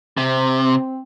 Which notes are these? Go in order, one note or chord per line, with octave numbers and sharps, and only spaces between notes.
C3 C4